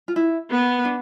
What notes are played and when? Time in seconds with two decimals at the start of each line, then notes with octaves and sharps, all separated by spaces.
0.08 F4
0.16 E4
0.50 B3
0.85 D4